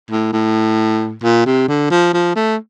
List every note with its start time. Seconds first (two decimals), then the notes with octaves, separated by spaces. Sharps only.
0.11 A2
0.33 A2
1.23 A#2
1.46 C3
1.68 D3
1.91 F3
2.13 F3
2.36 A3